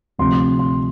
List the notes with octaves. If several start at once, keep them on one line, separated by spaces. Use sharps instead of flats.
D2 C3 F3 C4 C6
C6